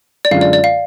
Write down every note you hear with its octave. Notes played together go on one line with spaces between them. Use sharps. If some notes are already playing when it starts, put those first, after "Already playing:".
D5
F#2 D3 G#3 C#4 F4 F5
D5
D5
F5